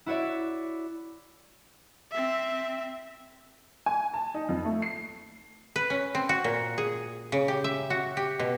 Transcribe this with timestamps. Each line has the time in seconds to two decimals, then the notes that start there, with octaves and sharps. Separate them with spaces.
0.06 E4 F#4 C#5 D5 E5
2.11 C4 E5
3.86 G#5
4.14 A5
4.34 D#4
4.49 F2
4.65 A3
4.82 C7
5.76 B4
5.90 C#4
6.15 C4
6.29 F#4
6.44 A#2
6.78 G#4
7.32 C#3
7.48 G4
7.64 E5
7.90 F#4
8.17 G4
8.39 B2